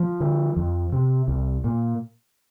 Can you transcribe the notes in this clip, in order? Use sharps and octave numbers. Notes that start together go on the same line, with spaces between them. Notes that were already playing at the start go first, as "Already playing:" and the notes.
Already playing: F3
D3
F2
C3
C2
A#2